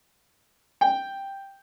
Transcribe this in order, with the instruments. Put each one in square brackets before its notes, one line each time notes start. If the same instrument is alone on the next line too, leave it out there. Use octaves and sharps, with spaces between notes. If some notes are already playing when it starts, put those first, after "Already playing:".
[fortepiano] G5